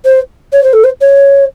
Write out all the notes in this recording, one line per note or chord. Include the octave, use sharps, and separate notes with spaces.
C5
C#5
C5
A4
C5
C#5